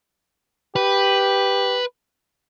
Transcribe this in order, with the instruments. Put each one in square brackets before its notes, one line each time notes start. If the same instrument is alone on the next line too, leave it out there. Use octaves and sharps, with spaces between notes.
[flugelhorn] G4 [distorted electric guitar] B4